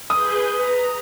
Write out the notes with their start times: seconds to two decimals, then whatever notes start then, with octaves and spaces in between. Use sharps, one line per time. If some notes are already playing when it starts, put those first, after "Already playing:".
0.10 G#4 B4 D#6 G6
0.58 B4 A#5